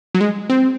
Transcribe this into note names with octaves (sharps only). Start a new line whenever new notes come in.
F#3
G#3
C4